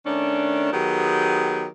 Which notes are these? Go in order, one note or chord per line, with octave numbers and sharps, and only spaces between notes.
D#3 A3 C#4 D4
D#3 F#3 B3 G4 G#4